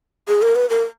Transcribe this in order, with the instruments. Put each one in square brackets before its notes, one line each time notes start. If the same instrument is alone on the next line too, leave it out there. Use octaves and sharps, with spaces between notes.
[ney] G#4
A#4
B4
A#4